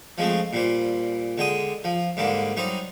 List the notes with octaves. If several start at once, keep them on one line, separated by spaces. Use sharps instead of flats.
F3 G#3 A3 C4
A#2 G3 C5
D3 G#3 G5 D#6
F3
G#2 D3 G3 A#3
F#3 G3 D#4 C5